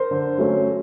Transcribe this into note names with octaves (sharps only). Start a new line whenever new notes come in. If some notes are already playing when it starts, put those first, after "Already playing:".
Already playing: A#4 C5
D3
F#3 A3 C#4